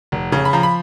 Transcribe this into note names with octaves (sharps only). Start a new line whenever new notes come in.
F1
C#3
B5
F3 A#5
B5